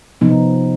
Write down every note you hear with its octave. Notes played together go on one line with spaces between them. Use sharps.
C3 F3 B3 D#4